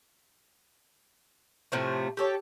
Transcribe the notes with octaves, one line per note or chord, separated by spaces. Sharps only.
A2 C3 F3 A3
G4 A4 C#5 A5